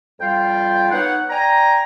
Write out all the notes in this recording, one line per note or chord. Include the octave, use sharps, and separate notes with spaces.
F2 G3 F4 F5 G5
B3 D#4 C#5 F#5
D5 G5 G#5 A#5